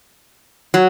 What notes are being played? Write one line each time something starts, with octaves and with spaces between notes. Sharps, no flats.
F#3